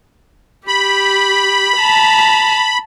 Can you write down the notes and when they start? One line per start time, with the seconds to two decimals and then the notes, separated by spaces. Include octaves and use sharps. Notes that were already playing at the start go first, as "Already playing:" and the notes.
0.68 G4 B5
1.77 A5 A#5